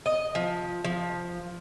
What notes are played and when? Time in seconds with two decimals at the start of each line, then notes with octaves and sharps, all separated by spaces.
0.06 D#5
0.35 F3
0.84 F3